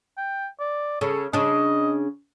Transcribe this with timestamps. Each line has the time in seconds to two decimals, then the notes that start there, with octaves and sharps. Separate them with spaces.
0.17 G5
0.60 D5
1.01 C#3 A4
1.33 C#3 D4 D#5